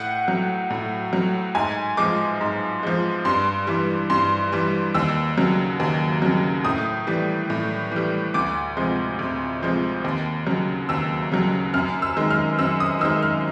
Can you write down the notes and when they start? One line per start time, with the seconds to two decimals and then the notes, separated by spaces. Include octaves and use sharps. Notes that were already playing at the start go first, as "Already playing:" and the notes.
Already playing: A2 F#5
0.28 F#3
0.70 A2
1.13 F#3
1.55 G#2 G#5
1.97 F3 G#3 D6
2.41 G#2
2.83 F3 G#3
3.25 G2 C6
3.67 E3 G3
4.10 G2 C6
4.52 E3 G3
4.95 D#2 E6
5.37 C#3 F#3
5.80 D#2
6.22 C#3 F#3
6.65 A2 D#6
7.07 E3 G3
7.50 A2
7.91 E3 G3
8.34 D2 D6
8.77 C3 F3 G#3
9.19 D2
9.62 C3 F3 G#3
10.04 D#2
10.46 C#3 F#3
10.89 D#2 E6
11.32 C#3 F#3
11.74 F#2 F6
12.02 E6
12.17 D#3 G#3
12.31 F6
12.59 F#2 E6
12.80 D#6
13.01 D#3 G#3 E6
13.22 F6